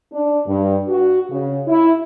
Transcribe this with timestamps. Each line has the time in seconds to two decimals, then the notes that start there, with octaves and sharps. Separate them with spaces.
0.12 D4
0.47 G2
0.88 F#4
1.30 C#3
1.68 E4